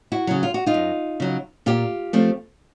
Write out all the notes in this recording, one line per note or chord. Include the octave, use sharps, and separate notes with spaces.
E4 F#4
C#3 F#3
F4
F#4
D#4 F4
F#2
C#3 F#3
A#2 F4 G4
F3 A3 C4